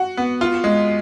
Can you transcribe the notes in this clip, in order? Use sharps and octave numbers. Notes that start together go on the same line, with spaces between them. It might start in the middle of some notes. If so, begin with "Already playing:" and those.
Already playing: F#4
B3
F4
G#3